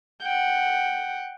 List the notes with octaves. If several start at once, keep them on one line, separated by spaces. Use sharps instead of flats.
F#5 G5